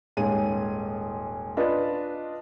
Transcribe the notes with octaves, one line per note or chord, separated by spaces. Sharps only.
D#1 G#2 G#4 C#5 D#7
D4 F4 B4 D#5